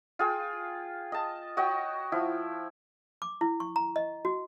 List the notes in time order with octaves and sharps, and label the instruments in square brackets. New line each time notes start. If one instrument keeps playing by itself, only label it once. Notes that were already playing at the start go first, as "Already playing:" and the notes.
[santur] F4 G#4 G5
D#5 A5
F#4 C#5 D#5 G5
F3 E4
[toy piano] D6
E4
C#6
A#5
D#5
F#4